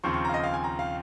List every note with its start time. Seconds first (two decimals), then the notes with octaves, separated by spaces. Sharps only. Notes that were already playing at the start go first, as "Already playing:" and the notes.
0.04 D#2 C#3 F3 C4 C#6
0.14 C#6
0.25 F5 A#5
0.34 D#5
0.44 F5
0.54 G#5
0.64 A#5
0.79 F5